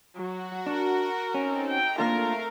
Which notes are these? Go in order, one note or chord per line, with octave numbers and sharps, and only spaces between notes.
F#3 F#4
D4 A#4
C4 C#4 D#4 A4
G5 A#5
A3 A#3 D4 F4 A#4 F5